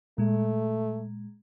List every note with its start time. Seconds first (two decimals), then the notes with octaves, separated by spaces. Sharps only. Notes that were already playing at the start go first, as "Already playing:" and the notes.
0.18 A#2 G#3 A3